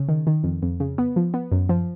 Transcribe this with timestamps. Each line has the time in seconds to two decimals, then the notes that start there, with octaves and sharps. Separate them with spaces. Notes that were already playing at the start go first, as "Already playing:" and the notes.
Already playing: C#3
0.09 D#3
0.27 D#3
0.44 F2
0.63 F2
0.80 C#3
0.98 B3
1.16 F3
1.34 B3
1.52 F#2
1.69 F3